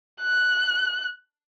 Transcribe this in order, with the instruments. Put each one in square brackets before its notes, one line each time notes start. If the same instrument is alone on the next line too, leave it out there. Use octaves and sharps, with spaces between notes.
[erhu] F#6